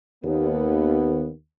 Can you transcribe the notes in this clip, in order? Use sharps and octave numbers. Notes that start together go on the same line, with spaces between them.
D#2 B3